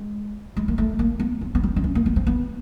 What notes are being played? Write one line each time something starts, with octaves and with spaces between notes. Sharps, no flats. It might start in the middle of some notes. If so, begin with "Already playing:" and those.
Already playing: G#3
G#3
A#3
A3
A#3
B3
C4
B3
C4
D4
C#4
A#3
B3
C4
B3